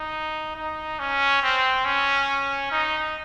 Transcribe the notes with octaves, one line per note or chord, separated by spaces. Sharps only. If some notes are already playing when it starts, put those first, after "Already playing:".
Already playing: D#4
D#4
C#4
C4
C#4
D#4